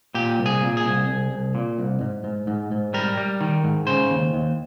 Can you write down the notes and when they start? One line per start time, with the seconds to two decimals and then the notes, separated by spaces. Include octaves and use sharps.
0.14 A#2 G4
0.38 C2
0.46 G#4
0.61 A#2
0.77 G#4
0.85 C2
1.08 C2
1.31 C2
1.55 A#2
1.78 C2
2.01 G#2
2.24 G#2
2.47 G#2
2.71 G#2
2.94 G3 A#4
3.17 G3
3.41 D#3
3.64 G#2
3.87 C#3 C5
4.10 D#2
4.33 D#2